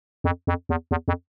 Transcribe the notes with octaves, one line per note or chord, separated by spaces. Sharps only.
F2
F2
E2
E2
F2